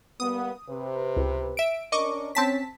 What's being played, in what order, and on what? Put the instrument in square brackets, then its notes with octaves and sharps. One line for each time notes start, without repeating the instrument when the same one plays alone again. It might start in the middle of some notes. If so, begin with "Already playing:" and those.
[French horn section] G3 A#3 B3 [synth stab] D#6
[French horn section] C3 B4
[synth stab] C#2
E5 D7
[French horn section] C#4 D4 A#4 [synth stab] D#5 C#6 D6
[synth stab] C4 A5 B6 [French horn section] C#4